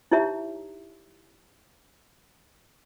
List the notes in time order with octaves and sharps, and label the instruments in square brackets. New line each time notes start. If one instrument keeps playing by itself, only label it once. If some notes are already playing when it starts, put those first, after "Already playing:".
[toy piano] D#4 E4 G4 C#5 E5 A#5